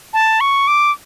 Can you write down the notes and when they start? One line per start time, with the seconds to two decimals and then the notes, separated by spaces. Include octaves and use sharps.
0.14 A5
0.41 C#6
0.68 D6